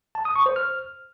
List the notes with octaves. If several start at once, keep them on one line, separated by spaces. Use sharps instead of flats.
A5
D#6
C#6
C5
F6